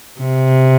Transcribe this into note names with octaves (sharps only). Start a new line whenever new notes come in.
C3